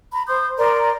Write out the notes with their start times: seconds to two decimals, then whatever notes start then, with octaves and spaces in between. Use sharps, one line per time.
0.13 A#5 B5
0.28 C5 C6 D#6 G6
0.58 A#4 D5 A#5 C6